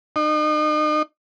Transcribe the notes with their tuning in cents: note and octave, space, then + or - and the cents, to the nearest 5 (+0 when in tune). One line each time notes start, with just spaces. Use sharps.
D#4 -40